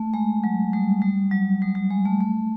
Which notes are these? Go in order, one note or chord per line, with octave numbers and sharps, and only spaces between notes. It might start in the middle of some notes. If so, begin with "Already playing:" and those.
Already playing: A3
G#3
F#3
G3
G3
F#3
G3
G3
G#3
A3
A3